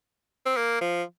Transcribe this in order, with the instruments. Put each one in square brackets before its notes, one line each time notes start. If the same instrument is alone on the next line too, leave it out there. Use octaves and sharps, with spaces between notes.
[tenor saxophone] C4
A#3
F3